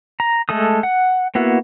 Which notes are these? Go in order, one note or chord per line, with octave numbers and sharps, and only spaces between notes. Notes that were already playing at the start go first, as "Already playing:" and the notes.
A#5
G#3 A3 A4 D#6
F#5
A#3 B3 E4 F#4